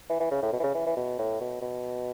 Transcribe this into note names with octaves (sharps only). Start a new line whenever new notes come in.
E3
E3
C#3
A2
B2
E3
C#3
E3
E3
B2
A2
B2
B2